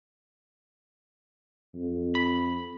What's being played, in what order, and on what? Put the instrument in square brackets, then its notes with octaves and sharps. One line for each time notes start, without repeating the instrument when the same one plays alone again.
[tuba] F2
[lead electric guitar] B5